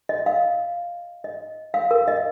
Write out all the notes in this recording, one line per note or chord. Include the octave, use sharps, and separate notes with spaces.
D#5
F5
D#5
F5
A#4
D#5